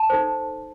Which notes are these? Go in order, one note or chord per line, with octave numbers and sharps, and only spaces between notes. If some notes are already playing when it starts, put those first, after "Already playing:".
Already playing: A5
D#4 A4 C5